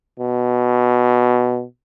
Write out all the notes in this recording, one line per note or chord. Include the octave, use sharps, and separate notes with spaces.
B2